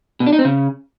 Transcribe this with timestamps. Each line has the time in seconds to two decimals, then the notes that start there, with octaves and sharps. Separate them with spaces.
0.20 B2
0.26 D4
0.33 D#4
0.39 C4
0.45 C#3